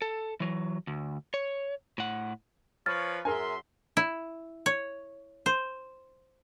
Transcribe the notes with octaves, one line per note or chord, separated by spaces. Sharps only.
A4
E3 F#3
D2
C#5
A2 F#5
F3 B4 C#5 F6 A6
F#2 G#4 A#4 E5 G#5 C6
E4
C#5
C5